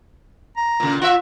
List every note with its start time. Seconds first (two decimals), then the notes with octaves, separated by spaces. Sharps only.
0.57 A#5
0.80 A#2 C#3
1.02 F4 E5 F#5